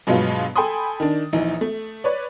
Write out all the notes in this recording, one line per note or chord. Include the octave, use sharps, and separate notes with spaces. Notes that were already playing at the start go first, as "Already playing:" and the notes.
G2 B2 F#3 G#3 B3 F4
A4 G5 G#5 B5 C6 D#6
D#3 D4
A#1 E3 D#4
A3
B4 C#5 D5